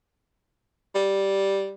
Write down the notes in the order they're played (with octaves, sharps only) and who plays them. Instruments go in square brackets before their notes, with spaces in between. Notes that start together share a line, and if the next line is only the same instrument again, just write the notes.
[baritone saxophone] G3